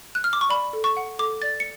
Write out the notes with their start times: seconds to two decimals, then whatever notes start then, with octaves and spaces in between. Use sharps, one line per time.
0.15 F#6
0.24 F6
0.33 D6
0.41 C#6
0.49 D5 B5
0.73 A4
0.84 C#6
0.97 F#5
1.19 A4 D6
1.42 D5 A6
1.60 C#7